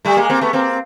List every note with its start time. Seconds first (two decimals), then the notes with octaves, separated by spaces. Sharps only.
0.05 G3 A3
0.17 G#3 A#3
0.29 A#3 C4
0.41 A3 B3
0.53 A#3 C4